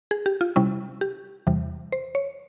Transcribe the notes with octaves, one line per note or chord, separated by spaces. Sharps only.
G#4
G4
F4
C3 G3 C#4 E4
G4
E2 C3 E3 G3
C5
C#5